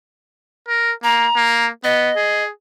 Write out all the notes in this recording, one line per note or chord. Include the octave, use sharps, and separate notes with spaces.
A#4
A#3 A#5
A#3
B3 D#5
G#4